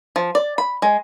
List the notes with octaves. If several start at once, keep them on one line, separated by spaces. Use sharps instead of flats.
F3
D5
B5
G#3